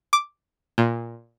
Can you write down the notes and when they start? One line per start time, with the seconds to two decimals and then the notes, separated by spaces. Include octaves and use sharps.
0.13 D6
0.78 A#2